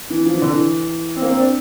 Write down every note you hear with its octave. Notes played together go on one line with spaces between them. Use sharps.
E3
F3
E3
D3
E3
C4
A#3
C4
D4